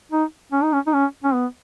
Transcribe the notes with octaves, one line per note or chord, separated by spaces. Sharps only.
D#4
C#4
D#4
C#4
D#4
C#4
C#4
B3